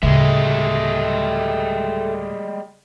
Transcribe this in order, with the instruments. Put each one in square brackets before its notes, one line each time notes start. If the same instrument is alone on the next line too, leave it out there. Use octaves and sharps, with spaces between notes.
[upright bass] D2 A2 [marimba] C#3 [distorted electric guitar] G3 G#3 [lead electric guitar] A4 E5